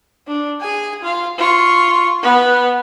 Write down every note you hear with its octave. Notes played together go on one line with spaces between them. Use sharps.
D4
G#4 G#5
F4 F5
F4 C#6
B3 B4